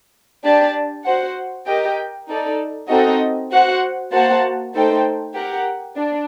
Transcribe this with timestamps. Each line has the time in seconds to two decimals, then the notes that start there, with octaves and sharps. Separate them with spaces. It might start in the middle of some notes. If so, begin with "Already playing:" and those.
0.45 D4 G4 D5 A5
1.06 F#4 C5 F#5
1.67 G4 A#4 D#5 G5
2.28 D#4 A4 D5
2.90 C4 D#4 F#4 A4 D#5
3.51 F#4 C5 F#5
4.13 A#3 F#4 C5 F#5 A5
4.74 A3 D#4 A4 C5 G5
5.35 G4 A#4 F#5
5.96 D4